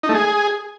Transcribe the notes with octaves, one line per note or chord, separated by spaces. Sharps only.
D#4
A3
G#4